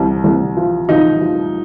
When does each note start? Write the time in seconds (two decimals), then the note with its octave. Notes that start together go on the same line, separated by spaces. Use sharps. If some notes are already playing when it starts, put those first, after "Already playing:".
Already playing: C2
0.24 C2
0.57 F3
0.89 F3 D#4
1.21 F3